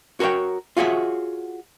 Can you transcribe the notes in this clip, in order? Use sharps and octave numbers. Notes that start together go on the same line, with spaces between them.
F#4 A#4 B4 C#5 G5
F4 F#4 G#4 C#5 E5